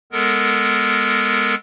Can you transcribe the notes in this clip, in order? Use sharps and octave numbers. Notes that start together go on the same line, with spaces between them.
G#3 B3 A4 A#4